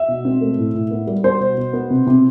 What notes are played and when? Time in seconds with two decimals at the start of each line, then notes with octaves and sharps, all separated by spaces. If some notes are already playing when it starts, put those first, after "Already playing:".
Already playing: E5
0.08 B2
0.25 C4
0.41 A3
0.58 A2
0.75 A2
0.91 B3
1.07 G3
1.24 B3 C5
1.40 B2
1.58 B2
1.73 B3
1.90 C3
2.07 C3